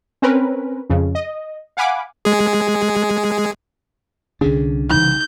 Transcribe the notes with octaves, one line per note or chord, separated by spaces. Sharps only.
C4 C#4 A#4 B4
F2 C#3
D#5
F5 F#5 G#5 B5 D6
G#3 G#4
C2 D3 C#4 D4 G#4
C2 C#3 E3 D#4 G6